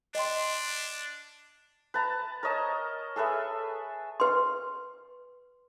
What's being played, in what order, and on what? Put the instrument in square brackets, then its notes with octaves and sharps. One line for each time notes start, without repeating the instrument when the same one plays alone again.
[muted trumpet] D4 [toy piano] D#5 G5 C6
[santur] B4 A5 A#5
A#4 C#5 D#5 A5
G#4 A4 B4 E5
[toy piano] B4 C6